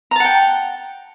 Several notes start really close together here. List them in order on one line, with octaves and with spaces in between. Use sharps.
A#5 A5 F#5 G5